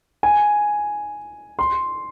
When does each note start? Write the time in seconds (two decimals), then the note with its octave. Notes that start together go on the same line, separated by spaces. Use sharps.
0.23 G#5
1.59 C6